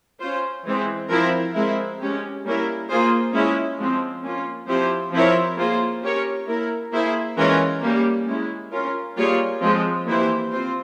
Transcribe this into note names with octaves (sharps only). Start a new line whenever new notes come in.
C#4 F4 C5
E3 G#3 C4
F3 C4 E4 A#4
G#3 C4 E4 A#4
G#3 C#4 G4
G3 A#3 C#4 E4 A#4
A#3 F4 G#4 C5
G#3 C#4 E4
F3 G#3 C4
A#3 C#4 F4
F3 C4 E4 G4 C5
F3 C4 E4 A#4 C#5
A#3 F4 G#4 C5
C#4 G4 A#4 C#5
A#3 E4 A#4
A#3 E4 G#4 C5
E3 G#3 C#4 F4 A#4
G3 A#3 C#4 G4
G#3 C#4 E4
C#4 F4 A#4
G3 A#3 F4 G#4 C#5
F3 G#3 C4
E3 A#3 E4 G4 C5
C4 F4 C5